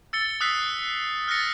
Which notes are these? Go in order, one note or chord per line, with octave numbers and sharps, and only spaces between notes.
E6 A6 C#7 G7
D#6 E6 F#6 B6 C7
F6 F#6 A6 A#6 C#7